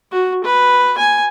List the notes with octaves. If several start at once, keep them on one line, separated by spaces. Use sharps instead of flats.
F#4
B4
G#5